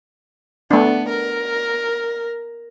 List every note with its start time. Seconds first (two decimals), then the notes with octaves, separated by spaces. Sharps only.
0.71 A3 B3 D4
1.09 A#4